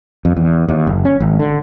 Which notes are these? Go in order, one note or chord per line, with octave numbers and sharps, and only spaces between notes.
F2
E2
D#2
F#1
C#4
G#1
D3